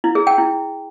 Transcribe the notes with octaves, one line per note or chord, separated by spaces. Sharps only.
E4
G#4
G5
E4